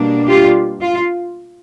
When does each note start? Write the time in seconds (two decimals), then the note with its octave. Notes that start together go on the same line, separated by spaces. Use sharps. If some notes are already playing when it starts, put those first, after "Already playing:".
Already playing: B2 G3 A#3 D4
0.27 F4 G4
0.82 F4